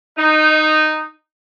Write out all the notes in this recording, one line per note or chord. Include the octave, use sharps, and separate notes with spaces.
D#4